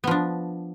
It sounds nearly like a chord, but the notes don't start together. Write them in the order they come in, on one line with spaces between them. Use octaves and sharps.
B3 F3 D4